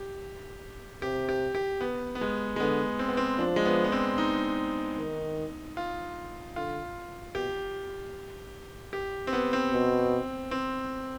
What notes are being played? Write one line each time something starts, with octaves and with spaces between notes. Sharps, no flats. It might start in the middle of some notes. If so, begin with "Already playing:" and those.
Already playing: G4
C3 G4
G4
G4
B3
B3
G#3
G#3
D3 B3
C4
B3
C4
F3 D4
G#3
B3
B3
C4
D#4
D#3
F4
D3 F4
B2 G4
G4
C4
B3
C4
B2
C4